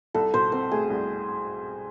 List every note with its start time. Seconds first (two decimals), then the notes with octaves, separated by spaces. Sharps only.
0.14 C2 A4
0.33 B2 C5
0.52 C4 C5
0.71 A3 G#4
0.90 C2